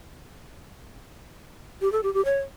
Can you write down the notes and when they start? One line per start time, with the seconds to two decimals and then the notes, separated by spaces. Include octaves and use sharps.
1.81 G4
1.92 A4
2.03 G4
2.14 G4
2.25 C#5